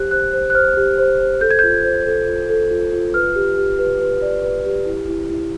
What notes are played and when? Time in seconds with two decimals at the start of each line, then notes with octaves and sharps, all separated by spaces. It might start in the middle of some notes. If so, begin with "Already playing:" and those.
Already playing: G4 C5 F#6
0.11 C5 F#6
0.33 C5
0.50 F#6
0.55 C5 F6
0.77 G4
0.99 C5
1.19 C5
1.41 A4 G6
1.51 G#6
1.59 F4 G6
1.84 C5
2.07 A4
2.28 F4
2.49 A4
2.71 F4
2.93 F4
3.14 B4 F6
3.35 G4
3.58 G4
3.79 B4
4.01 B4
4.22 D5
4.43 B4
4.66 G4
4.86 E4
5.08 E4
5.30 E4